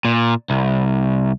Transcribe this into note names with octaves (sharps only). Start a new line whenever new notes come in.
A#2
C2